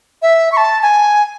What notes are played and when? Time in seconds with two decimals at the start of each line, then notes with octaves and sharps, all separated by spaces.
0.22 E5
0.52 C#6
0.57 A5
0.83 G#5